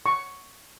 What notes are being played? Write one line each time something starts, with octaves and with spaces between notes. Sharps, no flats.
C#6